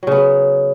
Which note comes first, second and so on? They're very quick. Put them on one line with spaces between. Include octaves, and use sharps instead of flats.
F#3 C#3 B3